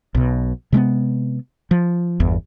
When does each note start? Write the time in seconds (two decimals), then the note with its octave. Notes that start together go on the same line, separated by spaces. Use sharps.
0.15 B1 B2
0.73 C3 G#3 A#3 B3
1.71 F3
2.20 G1 E2